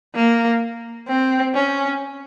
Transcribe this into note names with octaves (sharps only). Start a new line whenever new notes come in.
A#3
C4
C#4